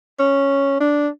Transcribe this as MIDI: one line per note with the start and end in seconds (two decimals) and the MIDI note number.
0.19 0.76 61
0.81 1.08 62